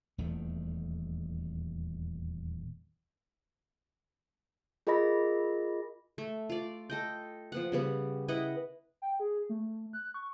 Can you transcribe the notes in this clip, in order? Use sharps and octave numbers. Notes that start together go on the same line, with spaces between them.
D#1 E2 D#3 A3
F4 G#4 A#4 D#5 B5 A#6
A3
F4 D5
A4 D#5 G5
F3 B3 F#5
C#3 G3 B3
E4 B4 D#5 F#5
G5
G#4
A3
F#6
C#6